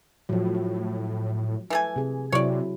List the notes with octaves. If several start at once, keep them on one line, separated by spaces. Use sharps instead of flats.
A2 F3 F#3
E3 A3 G#5
C3 G#4
C3 F#3 E4 C#5 D5